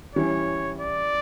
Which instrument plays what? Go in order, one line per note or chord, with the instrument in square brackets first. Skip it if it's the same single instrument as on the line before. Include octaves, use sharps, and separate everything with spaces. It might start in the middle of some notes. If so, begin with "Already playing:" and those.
[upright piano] E3 G3 C#4 E4 [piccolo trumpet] C#5
[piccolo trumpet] D5